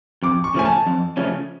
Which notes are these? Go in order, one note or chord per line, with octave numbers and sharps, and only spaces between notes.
F2 D6
C#6
C#3 F3 A3 C#4 G#5
A5
F2
C#3 F3 A3 C#4